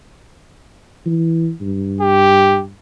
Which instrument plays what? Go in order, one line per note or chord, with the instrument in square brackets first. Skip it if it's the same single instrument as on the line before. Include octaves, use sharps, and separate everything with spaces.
[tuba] E3
G2
[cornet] G4